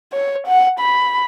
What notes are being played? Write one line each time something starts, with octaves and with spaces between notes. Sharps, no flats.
C#5
F#5
B5